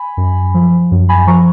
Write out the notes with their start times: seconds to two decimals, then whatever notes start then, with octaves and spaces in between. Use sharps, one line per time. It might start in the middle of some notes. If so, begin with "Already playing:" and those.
Already playing: G#5 B5
0.17 F#2
0.54 F3
0.91 F#2
1.09 G#5 B5
1.27 F3 A#5 C#6